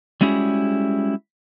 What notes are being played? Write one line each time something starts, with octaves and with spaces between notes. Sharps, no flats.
G3 G#3 C#4 E4 F#4 G#4